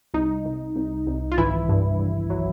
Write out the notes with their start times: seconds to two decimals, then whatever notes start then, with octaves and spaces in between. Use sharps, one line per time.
0.14 C2 D#4
0.45 C2
0.76 C2
1.07 C2
1.32 F4
1.38 G#1 E3 E4
1.69 G2
2.00 G2
2.30 F#3